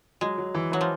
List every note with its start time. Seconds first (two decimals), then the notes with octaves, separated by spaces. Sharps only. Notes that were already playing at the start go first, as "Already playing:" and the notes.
0.21 F#3 G#3
0.38 F#3
0.55 E3
0.72 E3 F#3
0.81 F3